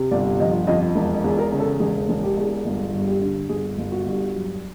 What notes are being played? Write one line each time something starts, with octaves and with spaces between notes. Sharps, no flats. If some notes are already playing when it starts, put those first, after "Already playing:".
Already playing: C3
G1 D5
F3 D#5
F2 D#5
E1
E2
A#4
C#3
A4
E1 G#4
E1
G4
E2
G1
G2
G4
D3
G1 G#4
G1
F#4
G2
F#3